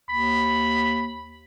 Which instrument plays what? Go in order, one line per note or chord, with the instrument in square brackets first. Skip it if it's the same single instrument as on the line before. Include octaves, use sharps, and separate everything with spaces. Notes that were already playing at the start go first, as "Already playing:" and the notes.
[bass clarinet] D#2 [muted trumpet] B5